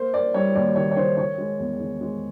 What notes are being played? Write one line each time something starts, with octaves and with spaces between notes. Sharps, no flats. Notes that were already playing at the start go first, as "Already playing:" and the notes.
Already playing: A#3 C5
A#3 D5
G3 C#5
D#2 D5
D#3 C#5
C#5
D#3 C5
D#3 C#5
G#3
E2
D#3
G#3